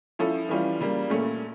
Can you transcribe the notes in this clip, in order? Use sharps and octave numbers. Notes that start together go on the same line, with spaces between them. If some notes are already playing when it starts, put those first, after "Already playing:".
F3 C#4 E4 A4
E3 G3 C#4 F4
C#3 G3 A#3
A#2 A3 C#4